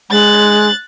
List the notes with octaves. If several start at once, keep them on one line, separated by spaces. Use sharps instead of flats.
G#3 F#6 A6